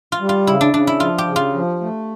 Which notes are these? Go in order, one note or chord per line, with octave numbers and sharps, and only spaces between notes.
F4
G3
F4
C#3 E4
D4
C#3 D4
E4
F3 F4
G4
C#3
F4
F3
A3